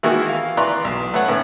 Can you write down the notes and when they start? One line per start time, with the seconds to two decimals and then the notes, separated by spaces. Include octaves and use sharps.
0.03 D#3 E3 G#3 A#3 E4 F#4
0.29 F5
0.57 E3 B4 D5 A#5 C6 C#6
0.85 B1
1.14 A3 B4 C#5 F#5
1.28 A2 D#3 B3 C#4